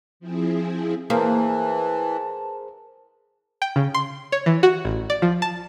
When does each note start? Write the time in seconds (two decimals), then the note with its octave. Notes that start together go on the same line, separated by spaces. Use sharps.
0.20 F3 C4 E4 G#4
1.10 E3 A#3 G#4 A#4 C5 A5
3.62 G5
3.76 C#3
3.94 C6
4.32 C#5
4.46 E3
4.63 F#4
4.85 A1
5.10 D5
5.22 F3
5.42 A5